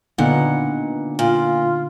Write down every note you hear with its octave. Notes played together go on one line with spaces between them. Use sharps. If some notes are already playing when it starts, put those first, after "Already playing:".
A#2 D3 B3 D#4 F#5
A#2 F4